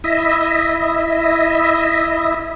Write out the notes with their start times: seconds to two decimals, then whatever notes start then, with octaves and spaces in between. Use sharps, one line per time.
0.04 E4 D#5 E5